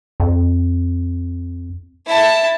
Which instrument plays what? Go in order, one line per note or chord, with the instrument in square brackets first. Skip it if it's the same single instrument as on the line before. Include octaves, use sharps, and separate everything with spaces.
[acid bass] F2
[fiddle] E4 A5